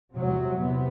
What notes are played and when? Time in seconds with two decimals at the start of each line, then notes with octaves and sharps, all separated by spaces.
0.15 E2 C3 F#3
0.58 E2 C3 B3